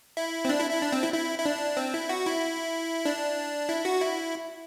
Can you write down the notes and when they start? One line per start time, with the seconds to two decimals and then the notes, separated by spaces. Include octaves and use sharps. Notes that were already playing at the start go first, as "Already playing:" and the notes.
0.17 E4
0.45 C4
0.49 D4
0.60 E4
0.71 E4
0.82 D4
0.92 C4
1.03 E4
1.13 E4
1.39 E4
1.45 D4
1.77 C4
1.94 E4
2.09 F#4
2.26 E4
3.05 D4
3.69 E4
3.85 F#4
4.01 E4